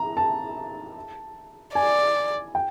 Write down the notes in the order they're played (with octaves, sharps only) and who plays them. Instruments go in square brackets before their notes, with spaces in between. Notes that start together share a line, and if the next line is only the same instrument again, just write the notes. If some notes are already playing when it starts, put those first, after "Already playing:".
Already playing: [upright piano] A#5
A5
[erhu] D5 [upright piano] G#5
[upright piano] G5